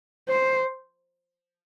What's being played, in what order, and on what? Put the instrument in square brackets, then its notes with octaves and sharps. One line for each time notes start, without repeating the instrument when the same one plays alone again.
[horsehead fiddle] C5